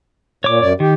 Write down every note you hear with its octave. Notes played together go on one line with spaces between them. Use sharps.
A#2 C#5 D6
F#2 D5
D#3 G4